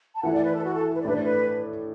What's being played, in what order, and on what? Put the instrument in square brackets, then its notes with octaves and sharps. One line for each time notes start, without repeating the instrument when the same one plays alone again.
[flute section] A5
[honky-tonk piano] E3 A3 E4 [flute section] F#5
[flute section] D5
B4
A4
F#4
A4
B4
D5
[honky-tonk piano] A2 A3 D4 [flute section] B4
[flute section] D5
B4